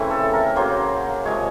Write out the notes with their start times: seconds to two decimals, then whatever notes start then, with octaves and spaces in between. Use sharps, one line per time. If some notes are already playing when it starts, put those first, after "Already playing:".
Already playing: C#3 E3 A3 C4
0.11 A4
0.33 A#4
0.56 C#3 F#3 A#3 C5
1.25 C3 F3 G#3 C#5